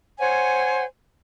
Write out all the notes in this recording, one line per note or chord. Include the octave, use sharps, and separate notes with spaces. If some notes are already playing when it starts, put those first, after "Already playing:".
C5 C#5 F#5 G#5